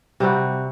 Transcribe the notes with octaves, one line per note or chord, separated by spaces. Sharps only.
C3 G3 C4 F#4